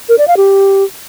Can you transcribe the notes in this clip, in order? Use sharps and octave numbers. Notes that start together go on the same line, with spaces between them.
A#4
D5
F5
G4